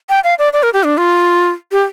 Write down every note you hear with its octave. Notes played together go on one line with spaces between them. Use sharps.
G5
F5
D5
D5
A#4
G4
D4
F4
G4